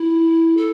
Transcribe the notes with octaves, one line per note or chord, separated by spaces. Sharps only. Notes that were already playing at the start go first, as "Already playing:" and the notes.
Already playing: E4
A4